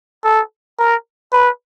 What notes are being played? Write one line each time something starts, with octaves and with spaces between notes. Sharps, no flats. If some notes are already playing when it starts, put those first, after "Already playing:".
A4
A#4
B4